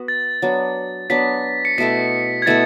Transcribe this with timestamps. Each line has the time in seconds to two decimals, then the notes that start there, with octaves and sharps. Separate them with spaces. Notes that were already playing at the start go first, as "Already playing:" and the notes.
Already playing: B3 F#4 B4
0.08 A6
0.42 F#3 B3 D4
1.10 F#3 B3 D4 B6
1.65 C#7
1.78 B2 A3 E4 A4 B6
2.42 G#6
2.46 B2 A3 E4 A4 A6